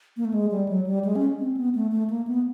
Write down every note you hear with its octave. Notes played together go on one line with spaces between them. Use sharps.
A#3
A3
G#3
G3
F#3
G3
G#3
C#4
C4
B3
A3
A3
A#3
B3